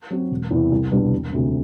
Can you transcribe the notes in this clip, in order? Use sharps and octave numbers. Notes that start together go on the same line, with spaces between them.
F#3 C4 F#4
E1
E2 C3 E3
C2
B2 G3 B3 D4
E1
D2 C3